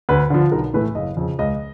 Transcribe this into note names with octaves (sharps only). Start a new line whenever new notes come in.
D2 B4
D3 F3
B1 A#4
A2 E3 A3 B4
F#1 D#5
F2 C#3
C#2 D#5